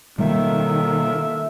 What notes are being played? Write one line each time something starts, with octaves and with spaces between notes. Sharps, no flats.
B2 D#3 G3 A#3 F4 A4 E5